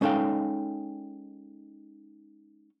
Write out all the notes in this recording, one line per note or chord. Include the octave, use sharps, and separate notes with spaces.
G#3 C#4 D#4 A4 F5 G5